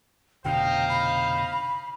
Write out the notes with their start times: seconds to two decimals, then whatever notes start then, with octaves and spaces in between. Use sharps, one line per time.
0.45 F1 B2 D3 D#4 C5 F5 G5
0.89 B5